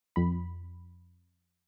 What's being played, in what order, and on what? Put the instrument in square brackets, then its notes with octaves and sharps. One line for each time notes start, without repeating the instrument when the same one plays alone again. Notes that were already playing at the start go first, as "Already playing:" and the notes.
[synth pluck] F2 B5